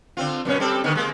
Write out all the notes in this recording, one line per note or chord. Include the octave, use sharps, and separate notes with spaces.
D3 C4 F4
F#2 B2 C#4
G3 C4 A4
D3 D#3 B3
G#3 A#3